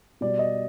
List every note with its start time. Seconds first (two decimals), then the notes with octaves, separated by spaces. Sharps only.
0.21 B2 G3 D5
0.39 D#5